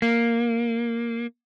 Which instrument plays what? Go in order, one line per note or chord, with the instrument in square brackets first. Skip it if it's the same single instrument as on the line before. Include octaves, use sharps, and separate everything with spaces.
[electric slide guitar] A#3